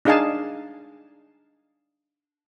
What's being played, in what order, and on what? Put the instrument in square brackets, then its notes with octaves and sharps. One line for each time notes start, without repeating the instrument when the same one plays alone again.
[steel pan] D4 D#4 G#4 F5 G#5 A5